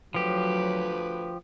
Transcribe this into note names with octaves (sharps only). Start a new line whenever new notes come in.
D2 F3 F#3 G4 B4